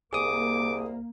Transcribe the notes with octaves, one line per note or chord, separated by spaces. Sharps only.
C2 A#3 G#4 D6 D#6